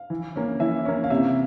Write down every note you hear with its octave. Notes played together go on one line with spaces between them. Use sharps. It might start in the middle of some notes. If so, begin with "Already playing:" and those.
Already playing: F5
E3
A#3 C#4
E3 E5
A#3 C#4
F5
C3 E5